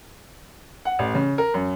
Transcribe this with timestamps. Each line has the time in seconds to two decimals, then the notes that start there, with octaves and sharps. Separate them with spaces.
0.85 F#5
0.99 A1
1.14 C#3
1.38 A#4
1.54 F#2